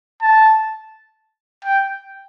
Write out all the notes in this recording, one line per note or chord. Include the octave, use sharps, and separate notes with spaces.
A5
G5